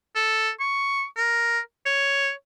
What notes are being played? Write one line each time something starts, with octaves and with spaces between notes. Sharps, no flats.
A4
C#6
A#4
C#5